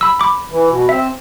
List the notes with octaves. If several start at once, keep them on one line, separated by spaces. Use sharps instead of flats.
B5 E6
B5 D6
E3
B2
C4 E5